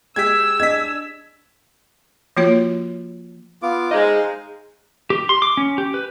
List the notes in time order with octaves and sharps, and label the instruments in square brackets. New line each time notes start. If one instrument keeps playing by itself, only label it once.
[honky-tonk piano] G#3 G4 G#4 [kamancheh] E6 [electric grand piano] G#6 B6
[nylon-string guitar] D4 D5 D#5 [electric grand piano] G#6 B6
[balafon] F3 A#3 F4 F#4 C#5
[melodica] B3 F4 D6
[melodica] D#4 C5 F5 [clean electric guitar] G#4 D#5
[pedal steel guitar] G4
C6
D6
C#4
G4
B4